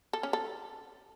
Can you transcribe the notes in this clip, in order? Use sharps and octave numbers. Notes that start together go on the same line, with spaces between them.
A4
C#4
A4